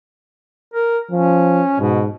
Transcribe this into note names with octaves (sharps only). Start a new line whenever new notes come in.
A#4
F3 C#4
G#2 B2